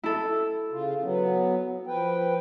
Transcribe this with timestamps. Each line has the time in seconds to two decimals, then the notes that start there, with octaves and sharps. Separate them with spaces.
0.03 E4 A4
0.72 C#3 F4
1.02 F#3 B3
1.87 F3 B4 G5